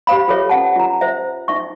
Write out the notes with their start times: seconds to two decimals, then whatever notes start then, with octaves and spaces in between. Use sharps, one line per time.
0.07 G4 C5 F5 B5
0.28 F4 G#4 A4 B4 C#5 E5
0.49 C#4 F#5 A5
0.76 F4 A#5
1.01 C5 E5
1.48 D#4 E5 C#6